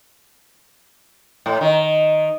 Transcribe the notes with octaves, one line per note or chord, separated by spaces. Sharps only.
A2
D#3